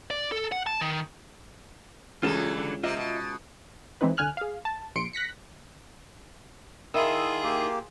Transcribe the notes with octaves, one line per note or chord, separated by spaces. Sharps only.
D5
A4
F#5
A5
D#3
C#2 G2 E3 F#3 C#4 F4 A4 E7
D3
C3 A#3 F4 D#5 E5
B2
E3 G#3 C4 D#4 E4 B4
C2 D3 G#5 F6 F#6
G#4 F5
A5
A#1 C6 C#7 D7
F#6 A#6 B6 C#7
D#3 E4 F4 G#4 D#6 E6
A#3 G4